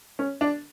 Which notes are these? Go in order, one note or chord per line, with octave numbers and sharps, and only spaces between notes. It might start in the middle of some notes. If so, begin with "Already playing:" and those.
C#4
D4